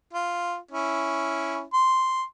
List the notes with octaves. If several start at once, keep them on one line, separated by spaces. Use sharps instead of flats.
F4
C#4 E4
C6